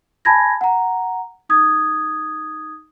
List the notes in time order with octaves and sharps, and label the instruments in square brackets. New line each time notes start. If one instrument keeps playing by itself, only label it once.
[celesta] G#5 A5 B5 G#6 A#6
F#5 A#5
D#4 D#6 G#6